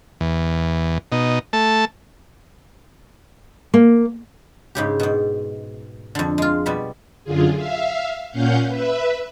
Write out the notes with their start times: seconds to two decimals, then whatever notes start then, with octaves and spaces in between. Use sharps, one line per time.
0.21 E2
1.12 B2 D#4
1.53 A3 A5
3.74 A#3
4.75 G#2 C#3 G4
5.00 G#2 B2
6.15 F2 D3
6.38 G#3 F4
6.66 B2 G3 B5
7.24 F#2 D3 F4 G#4
7.55 E5 F5
8.31 A#2 C#4 F5 F#5 G6
8.67 B4 E5